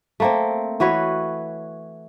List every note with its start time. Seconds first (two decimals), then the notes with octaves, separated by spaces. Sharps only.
0.20 A3 A#3 C4
0.80 E3 F#4 B4 C#5